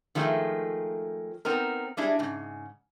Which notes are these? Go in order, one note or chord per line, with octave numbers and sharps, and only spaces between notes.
D#3 F3 G#3 A3
B3 C4 D#4 A#4
G3 G#3 D4 E4
G#2 C#3